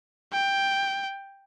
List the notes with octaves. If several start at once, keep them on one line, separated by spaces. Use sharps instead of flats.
G5